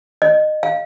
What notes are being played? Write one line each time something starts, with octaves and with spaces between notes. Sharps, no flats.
D#5
F5